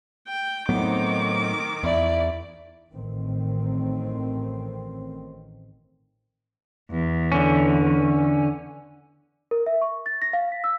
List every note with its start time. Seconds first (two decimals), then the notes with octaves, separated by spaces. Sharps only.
0.28 G5
0.69 A2 D#3 F#3 B3 C4 D#4 D6
1.83 E2 E4 D5
2.93 A1 A2 D#3 C4
6.91 E2
7.32 D3 C#4
9.51 A#4
9.66 E5
9.81 C#6
10.06 A6
10.22 A#6
10.33 F5
10.52 B6
10.64 E6